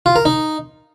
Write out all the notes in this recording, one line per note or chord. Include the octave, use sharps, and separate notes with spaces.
F4
A#4
D#4